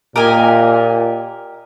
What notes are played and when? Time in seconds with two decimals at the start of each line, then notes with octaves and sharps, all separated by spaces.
0.15 A#2 G4 A#4 D#5 G#5